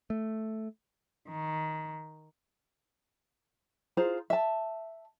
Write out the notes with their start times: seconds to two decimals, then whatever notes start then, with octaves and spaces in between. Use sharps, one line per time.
0.10 A3
1.28 D#3
3.97 F4 G#4 C5 A#5
4.30 E5 A5